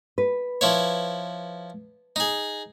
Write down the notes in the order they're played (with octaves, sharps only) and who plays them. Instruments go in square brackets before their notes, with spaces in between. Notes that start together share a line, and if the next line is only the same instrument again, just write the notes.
[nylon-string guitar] B4
[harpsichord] F3 E4 C#5
D#4 G#4